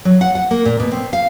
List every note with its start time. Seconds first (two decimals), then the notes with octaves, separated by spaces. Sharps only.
0.05 F#3
0.21 F#5
0.35 F#5
0.51 A#3
0.65 A#2
0.80 B2
0.92 C4
1.13 F5